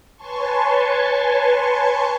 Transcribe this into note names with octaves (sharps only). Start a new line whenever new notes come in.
B4 C#5 G#5 A5 C6 C#6